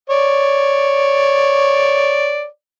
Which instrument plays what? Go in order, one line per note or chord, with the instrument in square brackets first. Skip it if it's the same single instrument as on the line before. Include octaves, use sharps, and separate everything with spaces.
[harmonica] C#5 D5